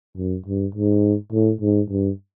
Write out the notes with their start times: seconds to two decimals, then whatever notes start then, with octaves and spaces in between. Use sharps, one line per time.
0.17 F#2
0.46 G2
0.75 G#2
1.32 A2
1.61 G#2
1.90 G2